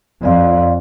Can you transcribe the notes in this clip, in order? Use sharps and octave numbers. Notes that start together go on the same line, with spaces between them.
F2 D5 F5 C6